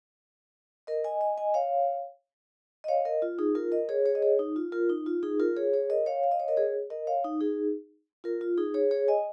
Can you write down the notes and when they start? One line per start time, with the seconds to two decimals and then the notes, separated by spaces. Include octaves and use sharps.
0.87 A#4 D#5
1.04 D#5 G#5
1.21 D#5 G#5
1.38 D#5 G#5
1.54 C#5 F5
2.84 D#5
2.88 C#5 F5
3.05 A#4 D#5
3.22 F4
3.39 D#4 G#4
3.55 F4 A#4
3.72 A#4 D#5
3.89 G#4 C#5
4.05 G#4 C#5
4.15 D#5
4.22 G#4 C#5
4.39 D#4
4.56 F4
4.72 F4 A#4
4.89 D#4
5.06 F4
5.23 D#4 G#4
5.40 F4 A#4
5.57 G#4 C#5
5.73 G#4 C#5
5.90 A#4 D#5
6.06 C#5 F5
6.24 F5
6.32 D#5
6.40 C#5
6.48 A#4 D#5
6.57 G#4 C#5
6.90 A#4 D#5
7.07 C#5 F5
7.25 D#4
7.41 D#4 G#4
8.24 F4 A#4
8.41 F4
8.57 D#4 G#4
8.74 G#4 C#5
8.91 G#4 C#5
9.08 D#5 G#5